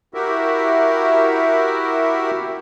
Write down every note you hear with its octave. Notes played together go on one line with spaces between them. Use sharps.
E4 F#4 G4 A#4 E5